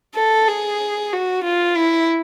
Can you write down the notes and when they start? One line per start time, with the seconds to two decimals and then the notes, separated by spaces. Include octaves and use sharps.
0.15 A4
0.48 G#4
1.13 F#4
1.44 F4
1.77 E4